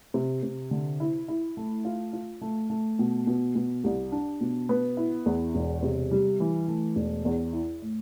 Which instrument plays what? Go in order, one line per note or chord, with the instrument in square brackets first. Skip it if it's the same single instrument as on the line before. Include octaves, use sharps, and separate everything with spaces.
[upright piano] C3
C3
D3
E4
E4
A3
F4
F4
A3
A3
B2
B2
B2
C2
D4
B2
B3
E4
E2
E1
C3
G3
E3
A3
E1
E2
E4
A2